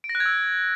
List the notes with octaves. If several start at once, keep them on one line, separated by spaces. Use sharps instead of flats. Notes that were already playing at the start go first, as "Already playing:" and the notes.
D7
A#6
F#6
G#6
E6